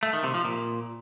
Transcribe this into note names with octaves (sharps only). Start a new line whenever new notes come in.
A3
D#3
C3
F3
A#2